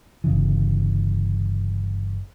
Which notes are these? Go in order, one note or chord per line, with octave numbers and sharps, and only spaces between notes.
G1 C#3 E3